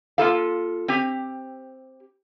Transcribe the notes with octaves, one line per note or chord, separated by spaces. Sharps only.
A#3 F4 A4 F5
C4 G4